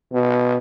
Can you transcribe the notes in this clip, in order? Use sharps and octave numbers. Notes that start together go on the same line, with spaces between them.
B2